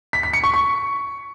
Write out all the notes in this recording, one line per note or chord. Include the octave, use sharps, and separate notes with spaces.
B6
B6
C#7
C#6
C#6